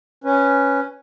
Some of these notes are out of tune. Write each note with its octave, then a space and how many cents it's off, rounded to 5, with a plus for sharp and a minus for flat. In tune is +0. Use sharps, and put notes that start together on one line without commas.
C#4 +0 B4 +0